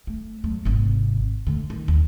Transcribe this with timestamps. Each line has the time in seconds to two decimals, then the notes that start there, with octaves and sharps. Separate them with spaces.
0.07 A3
0.44 F#3 A3
0.65 G#1 C3
1.47 D3 A3
1.70 D#3
1.88 D#2